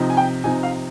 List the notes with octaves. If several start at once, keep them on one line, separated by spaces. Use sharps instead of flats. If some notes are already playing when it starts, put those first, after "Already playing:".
Already playing: C3 F3 C4 D#4
G#5
G5
C3 F3 C4 D#4 G#5
F5